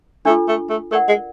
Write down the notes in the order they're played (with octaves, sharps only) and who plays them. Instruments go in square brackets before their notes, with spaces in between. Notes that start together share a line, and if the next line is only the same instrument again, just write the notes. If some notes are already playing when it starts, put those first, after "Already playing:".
[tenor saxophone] A3 [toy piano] D4 F4 A4
[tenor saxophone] A3
A3
[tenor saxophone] A3 [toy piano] A#4 D5 F#5
[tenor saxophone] G#3